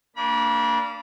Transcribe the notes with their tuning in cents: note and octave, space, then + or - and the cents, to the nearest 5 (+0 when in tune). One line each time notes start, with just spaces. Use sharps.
A#3 -20 D4 +0 B5 -35